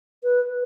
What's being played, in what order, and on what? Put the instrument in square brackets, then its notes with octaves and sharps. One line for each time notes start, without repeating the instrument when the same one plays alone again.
[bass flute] B4